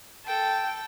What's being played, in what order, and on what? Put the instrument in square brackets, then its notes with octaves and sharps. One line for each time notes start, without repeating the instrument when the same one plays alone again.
[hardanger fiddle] A4 G5